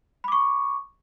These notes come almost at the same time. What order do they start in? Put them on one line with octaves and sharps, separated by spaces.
B5 D6 C#6